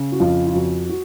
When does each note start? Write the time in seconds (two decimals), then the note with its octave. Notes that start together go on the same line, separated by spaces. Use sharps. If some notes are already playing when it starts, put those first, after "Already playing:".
Already playing: C#3
0.12 F#4
0.19 F2 F4
0.46 F4
0.54 F2 F#4
0.89 F#4